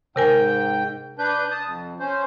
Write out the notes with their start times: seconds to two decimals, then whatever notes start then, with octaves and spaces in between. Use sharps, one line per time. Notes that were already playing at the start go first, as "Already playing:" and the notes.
0.16 G#2 C3 A#4 G5 G#5
1.19 D4 B4 G6
1.51 A5 D#6
1.66 F2
2.00 C#4 C5